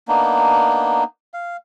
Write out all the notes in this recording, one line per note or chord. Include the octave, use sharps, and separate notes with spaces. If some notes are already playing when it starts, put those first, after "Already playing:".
A#3 B3 D4 D#4
F5